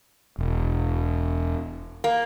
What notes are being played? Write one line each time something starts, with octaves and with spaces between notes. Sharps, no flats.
E1
A#3